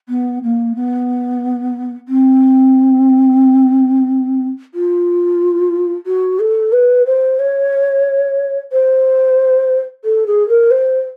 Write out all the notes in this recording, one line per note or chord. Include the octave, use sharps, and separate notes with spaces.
B3
A#3
B3
C4
F4
F#4
A4
B4
C5
C#5
C5
A4
G#4
A#4
C5